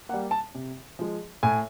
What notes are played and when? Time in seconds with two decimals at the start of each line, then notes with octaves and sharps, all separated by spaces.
0.09 A#3 F#5
0.14 G3
0.31 A5
0.55 C3
0.99 F3 G#3
1.43 A2 G#5